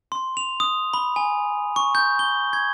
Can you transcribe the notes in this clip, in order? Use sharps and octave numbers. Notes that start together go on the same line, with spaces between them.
C6
F7
D#6
B5
G#5
C#6
G6
G7
G#6